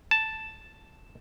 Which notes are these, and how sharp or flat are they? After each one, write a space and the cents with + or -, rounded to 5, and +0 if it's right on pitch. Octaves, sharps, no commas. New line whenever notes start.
A5 +0